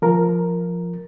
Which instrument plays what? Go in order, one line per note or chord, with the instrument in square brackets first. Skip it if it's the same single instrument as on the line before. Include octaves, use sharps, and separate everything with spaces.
[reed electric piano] F3 A#4